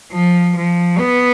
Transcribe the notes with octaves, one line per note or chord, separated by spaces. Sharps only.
F3
F3
B3